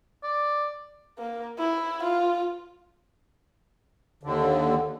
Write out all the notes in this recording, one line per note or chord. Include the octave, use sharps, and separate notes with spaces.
D5
A#3
E4
F4
D#2 D3